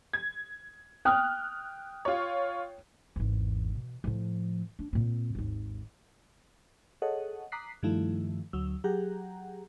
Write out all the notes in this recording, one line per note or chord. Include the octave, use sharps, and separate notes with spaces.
G#6
G5 D#6 F6 F#6
F4 C#5
G#1 E2
B2
A2 F3
D4
A#2 C4
G#1 D#2
G#4 A4 C#5 D#5 F#5
A#5 D6 D#6 F#6 B6 C7
G2 D#3 F3 A3 E4
D2 F#3 E6
F#3 G4 G#4 F#5 A#5